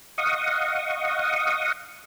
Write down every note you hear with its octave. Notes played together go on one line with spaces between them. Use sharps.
D#5 F5 F#5 C#6 D#6